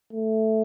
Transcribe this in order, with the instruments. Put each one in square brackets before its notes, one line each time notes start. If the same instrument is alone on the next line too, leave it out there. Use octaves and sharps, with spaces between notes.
[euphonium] A3